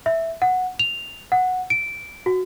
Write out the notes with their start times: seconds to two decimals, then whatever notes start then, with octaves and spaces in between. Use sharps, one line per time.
0.06 E5
0.42 F#5
0.79 F7
1.32 F#5
1.70 D7
2.26 F#4